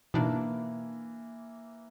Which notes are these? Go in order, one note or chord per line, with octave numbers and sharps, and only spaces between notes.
B2 E3 A#3 D4 D#4